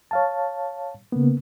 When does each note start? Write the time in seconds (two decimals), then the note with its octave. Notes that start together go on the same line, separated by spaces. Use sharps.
0.11 C#5 F5 A5
1.12 C#3 A#3 B3